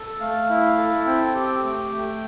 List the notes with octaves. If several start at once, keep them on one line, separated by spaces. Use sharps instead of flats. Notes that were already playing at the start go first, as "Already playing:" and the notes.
Already playing: A4
A3 F5
E4
A4
C4 G5
G4
A3
A3